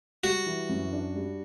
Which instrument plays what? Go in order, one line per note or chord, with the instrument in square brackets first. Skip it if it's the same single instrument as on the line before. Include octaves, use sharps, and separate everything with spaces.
[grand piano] G3 [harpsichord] F#4
[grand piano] E3
F#2
D4
G3